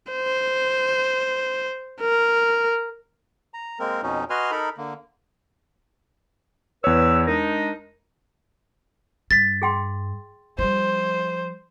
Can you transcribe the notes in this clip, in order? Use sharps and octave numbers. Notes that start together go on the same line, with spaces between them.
C5
A#4
A#5
G#3 A#3 C4 A#4
F2 B2 C#4 D#4
F#4 B4 D#5 G#5 C6 F6
D#4 A4 A#4 B5
D3 A#3
E2 B4 C#5 E6
G#3 D4 D#4 A#4
G2 A6 B6
G#4 G5 C6
F3 G3 C5